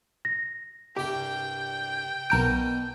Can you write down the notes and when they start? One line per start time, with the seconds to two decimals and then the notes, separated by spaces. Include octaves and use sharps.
0.25 A#6
0.97 C2 G2 G4 D5 G5
2.30 B1 B2 A#4 D5 A5 G6 D7